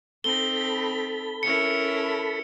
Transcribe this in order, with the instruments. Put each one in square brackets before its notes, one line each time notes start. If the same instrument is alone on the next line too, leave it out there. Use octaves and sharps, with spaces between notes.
[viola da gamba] C4 D#4 [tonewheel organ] A4 B5 [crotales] G7
[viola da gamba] C#4 E4 A#4 [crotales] C#7